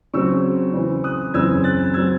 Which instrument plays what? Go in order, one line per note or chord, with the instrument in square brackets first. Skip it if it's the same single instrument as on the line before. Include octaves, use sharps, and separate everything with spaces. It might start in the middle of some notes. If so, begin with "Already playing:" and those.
[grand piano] C#3 F#3 C4 C#6 E6
C#3 E3 C4
D#6 F#6
F#2 C#3 E3 C4 E6 G#6
F#6 A6
F#3 C4 E6 G#6